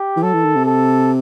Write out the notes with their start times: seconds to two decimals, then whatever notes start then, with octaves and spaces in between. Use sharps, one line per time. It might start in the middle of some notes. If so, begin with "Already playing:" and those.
Already playing: G4
0.17 E3
0.23 F#3 A4
0.34 E3
0.45 D#3
0.56 C3
0.66 A4